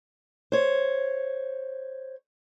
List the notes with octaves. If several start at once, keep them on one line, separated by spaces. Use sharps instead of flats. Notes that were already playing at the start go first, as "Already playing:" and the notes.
C5 C#5